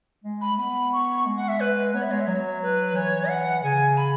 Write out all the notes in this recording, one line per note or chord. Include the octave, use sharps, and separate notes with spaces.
G#3
B5
G#3
B3 B5
C#6
G#3
F#5
E5
B4
B3 C#5
E5
G#3 C#5
E5
F#3 C#5
B4
E3 C#5
F#5
C#3 G#5
B5